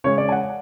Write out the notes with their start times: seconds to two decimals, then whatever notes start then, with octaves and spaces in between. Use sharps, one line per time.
0.04 C#3 G#3 C#4 C#5
0.18 D5
0.29 G#5
0.32 F#5